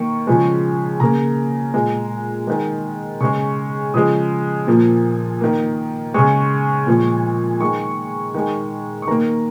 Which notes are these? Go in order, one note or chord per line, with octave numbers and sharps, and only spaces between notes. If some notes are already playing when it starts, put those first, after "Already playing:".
Already playing: D#3 A#3 C#6
C#3 F3 G#3
C#3 A#3 A#5
A#2 G#3
D#3 G#3
C#3 G#3 C#6
C#3 F3 G#3 D#6
A#2 F3 A#3
D#3 A#3
C#3 G#3 C#6
A#2 F3 G#3
D#3 G#3 C#6
D#3 G#3
C#6
D#3 A#3 A#5